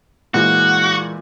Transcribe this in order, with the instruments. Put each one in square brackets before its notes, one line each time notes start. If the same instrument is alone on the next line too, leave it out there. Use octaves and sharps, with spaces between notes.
[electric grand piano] A#2 E3 G#3 [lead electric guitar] F#4